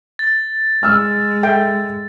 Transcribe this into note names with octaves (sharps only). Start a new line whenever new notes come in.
A6
G#3 E6 F6
A4 E5 G5